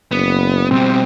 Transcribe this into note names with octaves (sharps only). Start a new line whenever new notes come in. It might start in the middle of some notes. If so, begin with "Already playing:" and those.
F#1 B3
B2 G3 C4